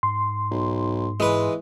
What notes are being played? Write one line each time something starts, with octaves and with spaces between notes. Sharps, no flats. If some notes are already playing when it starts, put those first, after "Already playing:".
G#2 C6
B1
E3 G#3 B4